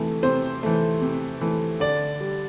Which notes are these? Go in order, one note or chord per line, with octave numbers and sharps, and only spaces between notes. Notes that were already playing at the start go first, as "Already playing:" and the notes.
Already playing: C3 E3 A3
C3 C5
E3 A3
C3
E3 A3
D3 D5
G3